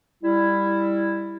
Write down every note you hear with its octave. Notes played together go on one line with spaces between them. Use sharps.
G3 E4